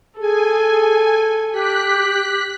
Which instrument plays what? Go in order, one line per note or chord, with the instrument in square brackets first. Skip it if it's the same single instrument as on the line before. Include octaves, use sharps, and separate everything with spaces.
[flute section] G#4 [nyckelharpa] A4 [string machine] G#5
[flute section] G4 [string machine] F#6 B6